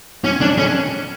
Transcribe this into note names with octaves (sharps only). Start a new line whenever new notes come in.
C#4
D4
C#4